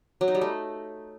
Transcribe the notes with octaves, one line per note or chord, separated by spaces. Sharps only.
F#3
D#4
G3
A3